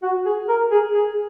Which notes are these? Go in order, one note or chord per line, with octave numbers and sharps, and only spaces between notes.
F#4
G#4
A#4
G#4
G#4